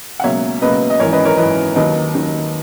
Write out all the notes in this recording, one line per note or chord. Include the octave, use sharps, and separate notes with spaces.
F#5
C#2 B2 F#3 A#3 C#5 E5
C#2 B2 F#3 A#3 B4 D#5
D#5
G#1 F#2 E3 A#4 C#5
B4 D#5
A#4 C#5
G#1 F#2 E3 B4 D#5
D#2 D#3 F#3 B4 D#5
D#2 D#3 F#3